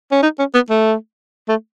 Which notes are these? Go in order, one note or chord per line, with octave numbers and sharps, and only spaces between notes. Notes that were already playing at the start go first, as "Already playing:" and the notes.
C#4
D#4
C#4
B3
A3
A3